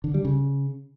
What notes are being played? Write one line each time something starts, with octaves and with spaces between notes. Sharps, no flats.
D3
G3
C#3